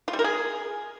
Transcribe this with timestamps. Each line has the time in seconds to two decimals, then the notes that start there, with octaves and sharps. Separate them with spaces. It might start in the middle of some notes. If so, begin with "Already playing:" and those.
0.08 F4
0.13 G3
0.19 A#4
0.24 G#4